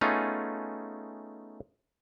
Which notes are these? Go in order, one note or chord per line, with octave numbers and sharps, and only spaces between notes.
A3 B3 C#4 D#4 F4 G#4